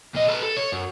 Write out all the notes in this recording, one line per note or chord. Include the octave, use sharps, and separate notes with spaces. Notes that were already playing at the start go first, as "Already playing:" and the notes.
A#2 D#5
A4 B4
A4
C#5
F#2